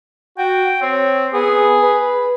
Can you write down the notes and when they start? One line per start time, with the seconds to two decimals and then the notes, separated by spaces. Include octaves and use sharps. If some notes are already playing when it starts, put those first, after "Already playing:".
0.38 F#4 G5
0.82 C4 C#5
1.33 B3 G#4
1.82 B4